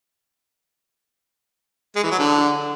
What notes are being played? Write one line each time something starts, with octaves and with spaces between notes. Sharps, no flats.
G#3
E3
F#3
D3